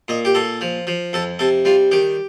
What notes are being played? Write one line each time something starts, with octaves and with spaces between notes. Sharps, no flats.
A#2 D#5
G4
A#2 A4
F3
F3
F2 A4
C3 A4
G3 F4
D#3 G4